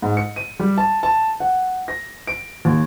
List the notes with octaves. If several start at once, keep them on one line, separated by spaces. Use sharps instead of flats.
G#2
C#7
D#7
G3
A5
A5
F#5
A#6
D7
D#2